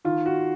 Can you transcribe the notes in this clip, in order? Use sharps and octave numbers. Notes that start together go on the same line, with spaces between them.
D#3 F4
F#4